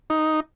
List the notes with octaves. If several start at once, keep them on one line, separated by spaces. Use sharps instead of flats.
D#4